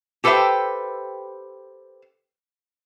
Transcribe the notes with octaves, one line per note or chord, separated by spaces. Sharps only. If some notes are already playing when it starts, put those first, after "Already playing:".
G4 A4 B4 C5 E5 G5